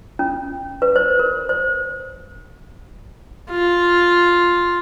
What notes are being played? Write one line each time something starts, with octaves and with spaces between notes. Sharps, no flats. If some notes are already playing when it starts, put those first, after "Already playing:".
C#4
B4
C5
A#4
C5
F4